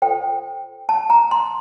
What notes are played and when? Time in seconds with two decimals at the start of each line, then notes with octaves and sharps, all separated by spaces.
0.02 F4 A4 C5 G5
0.89 A5
1.10 A#5
1.31 C6